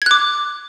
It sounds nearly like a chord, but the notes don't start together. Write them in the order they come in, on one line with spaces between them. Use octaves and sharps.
G#6 F#6 D6